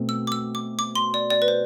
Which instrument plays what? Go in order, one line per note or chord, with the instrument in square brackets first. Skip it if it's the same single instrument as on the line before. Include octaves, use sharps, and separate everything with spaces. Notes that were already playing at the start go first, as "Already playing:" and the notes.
Already playing: [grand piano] B2 A3 C4
[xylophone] E6
D6
E6
D6
D6
C6
D5
D5
B4
C5